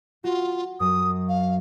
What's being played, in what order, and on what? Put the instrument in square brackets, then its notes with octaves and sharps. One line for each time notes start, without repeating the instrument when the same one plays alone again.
[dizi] F4 [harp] F#4
[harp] F#2 [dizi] D#6
[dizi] F5